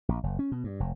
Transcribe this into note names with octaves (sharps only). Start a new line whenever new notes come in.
A#1
F#1
C#4
B2
G2
F1